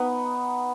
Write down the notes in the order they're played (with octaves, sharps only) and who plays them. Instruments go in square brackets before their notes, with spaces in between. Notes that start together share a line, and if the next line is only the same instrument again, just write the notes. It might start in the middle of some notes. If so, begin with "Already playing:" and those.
Already playing: [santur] B3 D#4